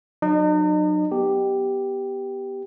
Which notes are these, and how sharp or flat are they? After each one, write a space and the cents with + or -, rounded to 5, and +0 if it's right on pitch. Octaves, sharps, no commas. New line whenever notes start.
F#3 -5 D#4 -45 D#5 -35
B3 +0 G4 +0